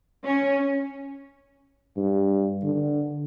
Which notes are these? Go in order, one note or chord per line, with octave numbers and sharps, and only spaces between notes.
C#4
G2
D3